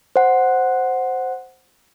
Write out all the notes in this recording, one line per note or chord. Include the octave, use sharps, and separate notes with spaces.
C5 F#5